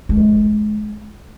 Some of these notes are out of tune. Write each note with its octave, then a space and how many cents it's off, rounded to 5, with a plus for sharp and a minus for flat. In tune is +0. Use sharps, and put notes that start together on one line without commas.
G#3 +30